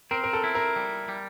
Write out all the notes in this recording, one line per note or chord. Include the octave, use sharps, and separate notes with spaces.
C4 A#4
A#4
A4
E4
A#4
G3
G3